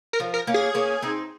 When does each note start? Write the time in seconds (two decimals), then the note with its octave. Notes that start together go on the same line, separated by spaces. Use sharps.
0.13 A#4
0.20 F3
0.34 A#4
0.47 A#3 C#4
0.54 G#4
0.75 A#3 C#4
1.02 C4 D#4